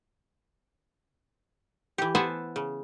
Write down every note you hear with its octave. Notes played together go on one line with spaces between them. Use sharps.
E3 G4
B3 C5 E5 F#5 G#5 A5
C#3